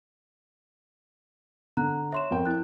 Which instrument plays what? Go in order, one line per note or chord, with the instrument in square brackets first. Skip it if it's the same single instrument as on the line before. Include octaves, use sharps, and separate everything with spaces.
[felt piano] D3 [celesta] A#5 F#6
[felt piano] C#5 [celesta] E5 C6 E7
[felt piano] F2 A#4 G5
[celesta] E4 F#6